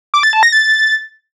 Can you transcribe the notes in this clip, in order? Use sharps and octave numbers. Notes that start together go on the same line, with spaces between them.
D6
A6
A5
A#6
A6